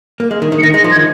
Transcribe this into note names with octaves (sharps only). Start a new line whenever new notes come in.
A#3
G#3
D#3
D#3
C#7
D#3 A#6
G#3
A#6
F3
G#6
D#3